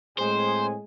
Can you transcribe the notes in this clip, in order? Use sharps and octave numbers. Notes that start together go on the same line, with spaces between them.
A2 G#3 C4 C5 G#5